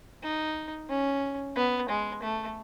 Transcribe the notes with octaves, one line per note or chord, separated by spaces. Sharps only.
D#4
C#4
B3
G#3
A3